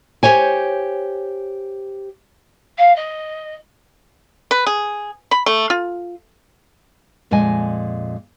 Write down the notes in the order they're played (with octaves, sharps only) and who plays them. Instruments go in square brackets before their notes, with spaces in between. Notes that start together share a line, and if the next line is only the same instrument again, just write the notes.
[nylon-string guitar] G4 C5 C#5 G#5
[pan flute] F5
D#5
[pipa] B4
G#4
B5
A3
F4
[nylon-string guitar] F2 A#2 G#3 D#5 G#5